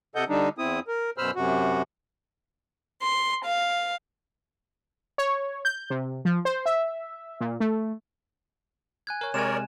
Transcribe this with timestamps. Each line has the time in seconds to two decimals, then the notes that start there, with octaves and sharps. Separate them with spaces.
0.15 C3 A4 D#5 F#5 G6
0.28 D3 G3 D4 D#4
0.58 E2 C4 E4 D#6
0.88 A#4
1.18 F#2 B2 C5 B5 E6 F6
1.36 F#2 C3 F#4
3.03 C6
3.45 F5
5.18 C#5
5.65 G6
5.90 C3
6.25 F3
6.45 C5
6.66 E5
7.41 A#2
7.60 A3
9.07 G#5 F#6 G#6
9.21 A#4 C#5
9.34 C3 G#3 A#4 C#5 D5 G#5 E7